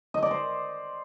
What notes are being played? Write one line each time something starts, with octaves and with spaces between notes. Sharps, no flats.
D#5
D5
C5